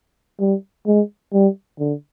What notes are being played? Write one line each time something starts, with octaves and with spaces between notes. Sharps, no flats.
G3
G#3
G3
D3